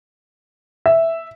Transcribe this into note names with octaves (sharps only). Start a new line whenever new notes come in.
E5